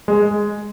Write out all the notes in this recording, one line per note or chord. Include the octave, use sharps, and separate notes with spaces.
G#3